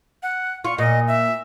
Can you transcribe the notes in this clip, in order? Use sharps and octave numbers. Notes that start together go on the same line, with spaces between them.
F#5
F4 C#6
A#2 D#5
E5